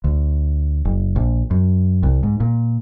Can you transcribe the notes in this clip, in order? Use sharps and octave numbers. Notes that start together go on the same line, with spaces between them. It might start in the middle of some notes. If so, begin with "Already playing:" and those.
D2
F#1
A#1
F#2
C2
G#2
A#2